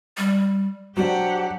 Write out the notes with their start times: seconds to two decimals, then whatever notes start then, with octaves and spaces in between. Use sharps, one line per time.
0.17 G3
0.97 F#3 D4 G4 C5 F#5